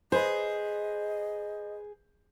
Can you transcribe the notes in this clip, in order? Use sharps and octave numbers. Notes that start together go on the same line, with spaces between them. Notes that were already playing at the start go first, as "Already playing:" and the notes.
G#4 B4 C5 D#5